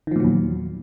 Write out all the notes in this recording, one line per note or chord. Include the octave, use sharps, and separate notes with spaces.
E2 A#2 D#3 F3 F#3